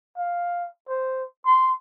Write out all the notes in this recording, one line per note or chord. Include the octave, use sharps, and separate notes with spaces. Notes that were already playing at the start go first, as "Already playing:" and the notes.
F5
C5
C6